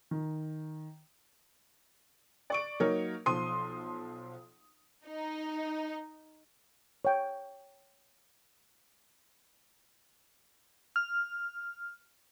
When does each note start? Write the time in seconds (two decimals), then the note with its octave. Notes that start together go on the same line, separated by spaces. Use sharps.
0.11 D#3
2.50 D5 C#6 D7
2.80 F#3 A#3 D#4 A#4 C#5
3.26 B1 F3 C6 D#6 D#7
5.06 D#4
7.05 C#5 G5
10.96 F6